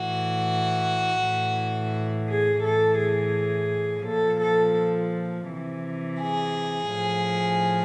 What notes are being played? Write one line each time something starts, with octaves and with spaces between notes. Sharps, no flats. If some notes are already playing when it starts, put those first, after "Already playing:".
Already playing: A2 E3 F#4
A2 E3
G#4
A2 E3 A4
G#4
A#2 F3 A4
A4
C3 E3
G#4
A2 F3